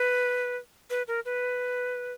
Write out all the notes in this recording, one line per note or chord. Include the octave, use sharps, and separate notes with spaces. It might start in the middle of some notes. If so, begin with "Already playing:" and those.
Already playing: B4
B4
A#4
B4